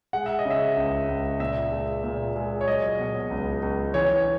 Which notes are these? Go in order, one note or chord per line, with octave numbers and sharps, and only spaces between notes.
G#3 F#5
E5
D#5
C#3
E5
C#2
C#2
A#2 E5
G#3
A#2
G#3
C#5
F#3 D#5
B2
C#2
C#2
E3 C#5